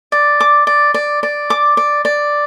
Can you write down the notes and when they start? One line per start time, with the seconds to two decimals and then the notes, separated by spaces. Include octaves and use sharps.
0.12 D5
0.40 D6
0.67 D5
0.94 D5
1.23 D5
1.50 D6
1.77 D5
2.05 D5